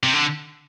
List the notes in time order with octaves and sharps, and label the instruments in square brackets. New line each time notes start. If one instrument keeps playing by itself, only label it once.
[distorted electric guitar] C3
D3